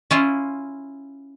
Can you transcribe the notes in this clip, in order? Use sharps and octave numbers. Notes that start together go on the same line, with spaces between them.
C#4 E4 F4